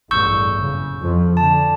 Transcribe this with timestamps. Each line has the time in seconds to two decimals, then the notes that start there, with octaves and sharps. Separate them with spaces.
0.11 A1 E2 G2 C#6 E6 G6
0.56 F#1 C#3
1.01 F2 F3
1.37 D3 A5